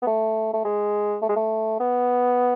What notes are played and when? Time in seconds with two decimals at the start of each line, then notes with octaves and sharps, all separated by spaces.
0.02 B3
0.07 A3
0.53 A3
0.65 G#3
1.22 A3
1.29 G#3
1.36 A3
1.80 B3